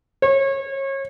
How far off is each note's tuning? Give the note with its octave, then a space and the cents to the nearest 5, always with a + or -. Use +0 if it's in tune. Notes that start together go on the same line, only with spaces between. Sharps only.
C#5 -30